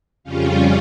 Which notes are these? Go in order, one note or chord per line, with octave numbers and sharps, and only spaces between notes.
F2 C#3 G3 C#4 F4